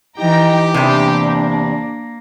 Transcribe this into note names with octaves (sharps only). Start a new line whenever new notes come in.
E3 D#4 G4 G5 A#5
E2 C3 A#3 D4